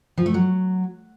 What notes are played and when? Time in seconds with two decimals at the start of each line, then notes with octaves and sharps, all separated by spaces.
0.17 F3
0.26 A3
0.34 F#3